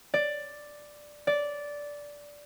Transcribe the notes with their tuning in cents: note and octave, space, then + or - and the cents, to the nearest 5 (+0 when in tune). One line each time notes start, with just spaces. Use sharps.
D5 +5
D5 -10